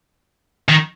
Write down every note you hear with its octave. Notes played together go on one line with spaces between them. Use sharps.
D#3